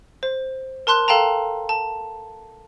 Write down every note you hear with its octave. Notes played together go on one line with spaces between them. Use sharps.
C5
A#4 A5 C6 F#6
A4 F5 G5 A5 A#5
A5